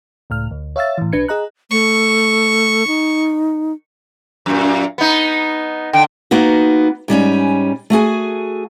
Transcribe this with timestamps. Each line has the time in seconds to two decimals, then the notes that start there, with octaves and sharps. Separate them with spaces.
0.30 C#2 A2 F6
0.51 D2
0.76 C#5 E5 F5 E6 A6
0.98 A2 E3
1.12 B1 D4 B4 G#6 C#7
1.28 G#4 D#5 A#5 F#6
1.71 A3 C#6
2.87 D#4
4.46 F#2 A#2
4.98 B3 D#4
5.93 D3 G5
6.31 A#3 B3 D#4 F#4
7.08 G#2 G3 C#4 G#5
7.90 A3 F#4 G#4 G#5